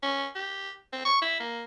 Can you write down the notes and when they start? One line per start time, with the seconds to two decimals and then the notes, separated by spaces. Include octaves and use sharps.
0.02 C#4
0.35 G4
0.93 C4
1.05 C#6
1.22 E4
1.40 A#3